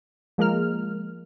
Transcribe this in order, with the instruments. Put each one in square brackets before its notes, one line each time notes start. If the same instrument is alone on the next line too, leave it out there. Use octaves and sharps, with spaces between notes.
[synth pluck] F3 G#3 A#3 A#4 F6